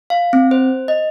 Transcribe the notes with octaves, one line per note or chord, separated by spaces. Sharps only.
F5
C4
C5
D#5